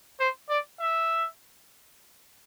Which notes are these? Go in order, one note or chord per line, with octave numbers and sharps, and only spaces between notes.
C5
D5
E5